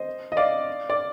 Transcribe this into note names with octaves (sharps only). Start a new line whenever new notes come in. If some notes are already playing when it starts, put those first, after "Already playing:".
Already playing: C5 D#5
D#5
D5 F5
D5